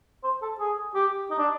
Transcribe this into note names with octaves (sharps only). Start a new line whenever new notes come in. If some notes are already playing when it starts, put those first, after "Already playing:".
C5
A4
G#4
G4
D#4
D4